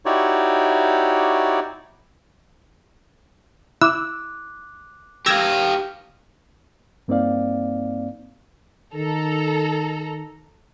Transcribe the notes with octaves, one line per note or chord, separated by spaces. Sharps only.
D#4 E4 F#4 G4 C#5 D5
E4 D6 E6 F#6
G4 F5 E6 G#6 A#6
G2 A#3 C4 D#4 D5 F5
D#3 A4 A#5